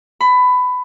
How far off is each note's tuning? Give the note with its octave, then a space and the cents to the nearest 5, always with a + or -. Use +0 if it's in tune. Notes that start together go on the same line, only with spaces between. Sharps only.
B5 +20